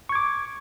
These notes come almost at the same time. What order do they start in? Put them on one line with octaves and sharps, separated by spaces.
C#6 G#6 D6